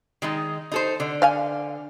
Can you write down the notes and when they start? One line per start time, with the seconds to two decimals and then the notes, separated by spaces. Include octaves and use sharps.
0.22 D#3 G#3 D#4
0.72 D#4 A4 C5
1.00 D3
1.22 D5 F5 G#5